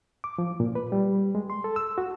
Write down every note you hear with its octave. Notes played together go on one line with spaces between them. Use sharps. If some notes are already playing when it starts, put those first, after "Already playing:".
D6
F3
A#2
B4
G3
G#3
C6
A4
E6
F#4